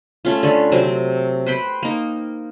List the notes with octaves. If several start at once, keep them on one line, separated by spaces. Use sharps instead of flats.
A3 C#4 F4
D3 C#4 A4 B5
C3 F#3 C4
B4 C5 G5 B5
A#3 D#4